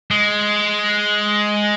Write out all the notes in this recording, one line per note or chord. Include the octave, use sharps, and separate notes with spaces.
G#3